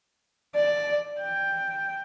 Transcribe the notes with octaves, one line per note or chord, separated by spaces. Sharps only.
D5
G5